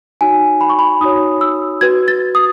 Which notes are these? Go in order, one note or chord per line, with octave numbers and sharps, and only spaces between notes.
D#4 F#4 C#5 G#5
B5
C#6
B5
D#4 F#4 C#5 D#6
E6
F#4 B4 G#6
A6
D#6